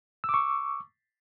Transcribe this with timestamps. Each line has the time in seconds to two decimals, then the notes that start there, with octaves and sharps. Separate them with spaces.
0.24 E6
0.29 D6
0.34 C#6